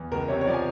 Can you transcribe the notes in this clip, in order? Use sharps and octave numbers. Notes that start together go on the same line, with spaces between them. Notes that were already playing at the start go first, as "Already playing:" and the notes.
Already playing: E2
C#2 A#4
C3 C#5
C#5
F3 D5
G#5